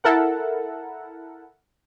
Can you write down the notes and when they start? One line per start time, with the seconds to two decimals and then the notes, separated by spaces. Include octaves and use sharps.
0.04 E4 A4 A#4 F#5